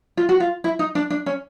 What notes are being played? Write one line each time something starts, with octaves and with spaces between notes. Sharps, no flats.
F4
F#4
F4
E4
D#4
D4
D4
C#4